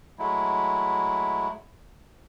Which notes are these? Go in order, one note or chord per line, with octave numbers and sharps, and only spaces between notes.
F#3 G#3 A3 E4